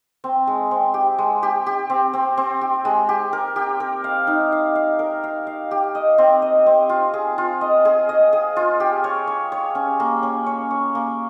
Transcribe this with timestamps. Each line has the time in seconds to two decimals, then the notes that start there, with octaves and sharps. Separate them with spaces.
0.24 C4
0.47 G#3
0.71 C4
0.94 G4
1.18 G#3
1.43 G4
1.66 G4
1.90 C4
2.13 C4
2.37 C4
2.61 G4
2.85 G#3
3.09 G4
3.33 A#4
3.56 G4
3.80 A#4
4.04 F5
4.27 D#4
4.52 F5
4.75 F5
4.99 A#4
5.24 F5
5.47 F5
5.71 G4
5.95 D#5
6.18 C4
6.42 D#5
6.66 C4
6.89 F4
7.14 G#4
7.38 F4
7.61 D#5
7.85 G#4
8.09 D#5
8.33 G#4
8.56 F4
8.80 G4
9.04 C#5
9.27 C#5
9.52 C#5
9.75 C#4
10.00 A#3
10.23 C#4
10.46 C#5
10.71 C#5
10.95 A#3